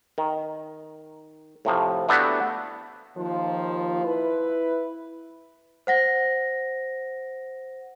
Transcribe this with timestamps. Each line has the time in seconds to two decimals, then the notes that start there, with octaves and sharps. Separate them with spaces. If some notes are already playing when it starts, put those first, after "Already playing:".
0.18 D#3
1.65 A2 C3 F3
2.09 A3 B3 D4 E4 F#4 G4
3.16 D#2 D#3 F3 F4
4.04 E4 B4
5.87 C5 F#5 A#6